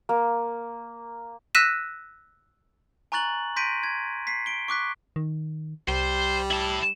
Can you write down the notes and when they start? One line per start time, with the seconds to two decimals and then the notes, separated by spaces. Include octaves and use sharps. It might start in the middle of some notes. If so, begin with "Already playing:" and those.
0.09 A#3
1.55 E6 F#6 A#6 B6 D#7 E7
3.12 G#5 A#5 C#6 F#6 A6 F#7
3.56 C6 G6 A#6 B6 D7 D#7
3.83 G#6
4.27 B6 C7
4.46 D7 G7
4.68 C#6 D6 F#6 B6
5.16 D#3
5.88 C2 G3 C5
6.51 E4 A5